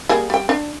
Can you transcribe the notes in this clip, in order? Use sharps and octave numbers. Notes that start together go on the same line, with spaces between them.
G3 A#3 G#4
G3 G5
D4